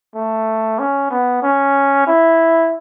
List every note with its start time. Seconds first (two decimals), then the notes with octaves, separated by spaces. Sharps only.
0.15 A3
0.79 C#4
1.10 B3
1.43 C#4
2.07 E4